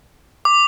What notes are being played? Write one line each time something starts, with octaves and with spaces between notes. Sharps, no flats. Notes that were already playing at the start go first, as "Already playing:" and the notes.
D6